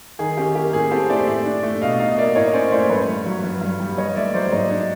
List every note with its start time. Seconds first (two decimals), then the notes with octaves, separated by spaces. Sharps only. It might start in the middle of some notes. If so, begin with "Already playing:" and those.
0.19 D#3 G#4
0.37 C#4 G4
0.55 A#3 G4
0.73 A2 G#4
0.91 C4 G4 A4
1.09 A3 C5 D5
1.27 A2 D5 E5
1.45 D4
1.63 A3
1.81 B2 D#5 F5
1.99 D#4 D#5 F5
2.17 A#3 D5 E5
2.35 A2 C#5 D#5
2.53 C#4 C5 D5
2.71 A3 C5 D5
2.90 G2 B4 C#5
3.08 G2
3.26 F#3
3.44 G2
3.61 G2
3.80 G3
3.97 G2 C#5 D#5
4.15 A3 D5 E5
4.33 F#3 C5 D5
4.52 G#2 C#5 D#5
4.70 D4